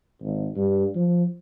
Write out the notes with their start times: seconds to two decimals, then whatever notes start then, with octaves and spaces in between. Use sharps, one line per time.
0.21 G#1
0.56 G2
0.95 F3